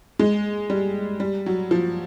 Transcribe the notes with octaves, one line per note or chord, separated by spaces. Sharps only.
G#3
G3
G3
F#3
F3